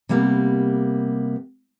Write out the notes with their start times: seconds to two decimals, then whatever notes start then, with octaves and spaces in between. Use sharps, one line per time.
0.09 C3 G3 A#3 B3